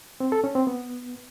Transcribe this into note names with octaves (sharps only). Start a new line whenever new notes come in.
C4
A4
C#4
C4
B3